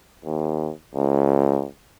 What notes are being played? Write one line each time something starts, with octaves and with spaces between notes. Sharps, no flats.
D#2
C#2